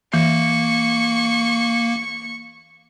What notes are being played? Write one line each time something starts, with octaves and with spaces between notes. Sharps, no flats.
E3 A#3 C#6